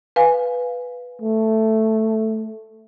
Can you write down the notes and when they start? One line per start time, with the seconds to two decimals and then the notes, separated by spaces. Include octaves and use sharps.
0.16 B4 F5 G#5
1.22 A3